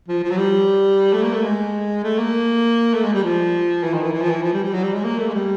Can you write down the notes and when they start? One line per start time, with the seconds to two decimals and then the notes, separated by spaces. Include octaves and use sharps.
0.08 F3
0.23 F3
0.31 F#3
0.37 G3
1.13 A3
1.23 A#3
1.33 A3
1.44 G#3
2.03 A3
2.18 A#3
2.94 A3
3.03 G#3
3.14 G3
3.23 F3
3.83 E3
3.94 D#3
4.03 E3
4.13 E3
4.22 F3
4.31 E3
4.43 F3
4.54 G3
4.64 G3
4.73 F#3
4.83 G3
4.94 G#3
5.04 A#3
5.19 A3
5.29 G#3
5.34 G3